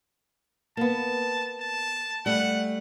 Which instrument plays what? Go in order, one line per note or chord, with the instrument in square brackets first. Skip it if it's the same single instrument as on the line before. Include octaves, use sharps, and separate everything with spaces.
[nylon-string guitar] A#3 B3 [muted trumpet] A5
[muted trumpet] A5
[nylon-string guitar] G3 A3 [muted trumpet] F#5